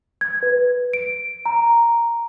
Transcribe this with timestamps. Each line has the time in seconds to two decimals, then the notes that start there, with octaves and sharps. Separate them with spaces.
0.21 G#6
0.43 B4
0.93 D7
1.46 A#5